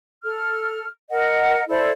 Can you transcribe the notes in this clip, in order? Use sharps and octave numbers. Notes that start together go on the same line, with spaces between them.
A4 F6
A#4 D#5 F#5
E4 A4 C5 D5